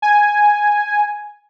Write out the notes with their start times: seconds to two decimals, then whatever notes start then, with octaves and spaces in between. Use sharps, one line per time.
0.02 G#5